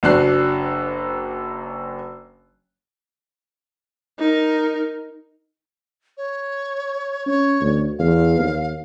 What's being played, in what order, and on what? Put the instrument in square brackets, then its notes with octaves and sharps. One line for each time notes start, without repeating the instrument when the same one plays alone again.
[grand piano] F#1 F#3 D4 F#6 C7
[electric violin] D#4 A#4
[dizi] C#5
[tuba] C#4 [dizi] C#5
[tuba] D2
[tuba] E2 [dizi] F5
[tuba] D#2